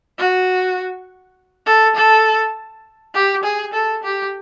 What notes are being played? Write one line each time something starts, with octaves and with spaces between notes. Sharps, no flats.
F#4
A4
A4
G4
G#4
A4
G4